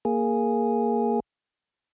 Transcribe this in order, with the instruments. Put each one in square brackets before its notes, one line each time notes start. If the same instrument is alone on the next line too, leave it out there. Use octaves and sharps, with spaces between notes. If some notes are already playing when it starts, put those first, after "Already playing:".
[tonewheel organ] A#3 G#4